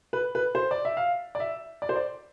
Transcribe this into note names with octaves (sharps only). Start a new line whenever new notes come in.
B4
B4
C5
D5
E5
F5
D5
E5
D5
C5
D5